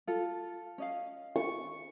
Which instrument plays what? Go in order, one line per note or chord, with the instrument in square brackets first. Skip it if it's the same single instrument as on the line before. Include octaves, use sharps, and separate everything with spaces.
[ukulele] F4 A4
C#4 D#5 F5
[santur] C#6